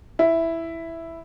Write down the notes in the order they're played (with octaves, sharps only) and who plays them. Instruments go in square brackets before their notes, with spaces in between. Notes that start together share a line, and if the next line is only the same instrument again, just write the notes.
[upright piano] E4